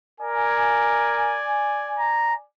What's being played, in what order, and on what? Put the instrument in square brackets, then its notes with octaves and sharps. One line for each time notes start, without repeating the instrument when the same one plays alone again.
[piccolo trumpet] A#4 [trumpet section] D5 G#5
[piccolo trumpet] A#5